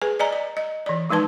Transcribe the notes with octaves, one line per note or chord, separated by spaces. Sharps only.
G#4 B4 G#5
D5 D#5 G#5 A#5
D5
D#5
E3 D5
F3 G#3 D#4 B4 A5